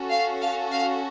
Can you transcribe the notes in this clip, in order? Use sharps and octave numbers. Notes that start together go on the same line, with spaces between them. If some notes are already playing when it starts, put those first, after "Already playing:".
Already playing: C#4 F#4 A4
F5
F5
F5